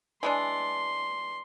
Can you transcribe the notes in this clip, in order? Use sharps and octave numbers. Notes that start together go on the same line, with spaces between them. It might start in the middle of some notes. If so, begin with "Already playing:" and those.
E3 G#3 D4 C6